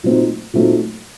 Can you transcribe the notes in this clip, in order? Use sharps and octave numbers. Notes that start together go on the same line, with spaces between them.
A#2 F#3 A3 C4 D#4
A#2 F#3 A3 C4 D#4